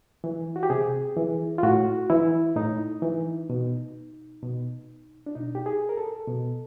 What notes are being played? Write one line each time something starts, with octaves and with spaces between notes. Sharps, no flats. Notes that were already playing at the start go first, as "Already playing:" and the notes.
E3
F#4
G4
C3 G#4
E3
F4
A2 F#4
E3 E4
A2 D#4
E3
B2
B2
D4
B2 D#4
G4
G#4
A#4
A4
B2